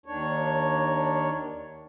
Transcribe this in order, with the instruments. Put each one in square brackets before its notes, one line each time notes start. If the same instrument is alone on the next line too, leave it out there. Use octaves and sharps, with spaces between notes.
[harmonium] D#2 D#3 D4 C#5